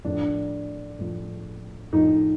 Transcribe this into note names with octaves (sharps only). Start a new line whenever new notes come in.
A2 F3 D4
A2 F3
A2 F3 D#4